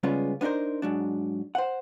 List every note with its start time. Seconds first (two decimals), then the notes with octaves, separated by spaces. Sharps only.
0.03 C#3 G3 G#3 B3 C#4 F4
0.41 B3 D4 D#4 A#4 C5
0.82 G#2 F#3 D4
1.55 C5 F#5